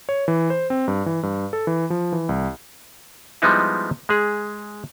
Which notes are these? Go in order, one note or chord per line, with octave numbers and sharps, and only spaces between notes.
C#5
E3
C5
C4
G2
E3
G2
A4
E3
F3
E3
C2
F3 G3 G#3 B3 D#4 E4
G#3 G#4